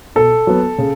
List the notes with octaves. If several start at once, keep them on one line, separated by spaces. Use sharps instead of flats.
B2 A4
F#3 B3
C#3